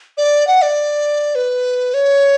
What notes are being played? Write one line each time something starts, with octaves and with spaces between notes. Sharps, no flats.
D5
F#5
D5
B4
C#5